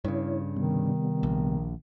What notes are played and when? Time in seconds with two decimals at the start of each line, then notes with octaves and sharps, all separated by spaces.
0.04 G2 C#3 E4 C#5
0.57 C3 D#3 G3 B3
1.23 A#1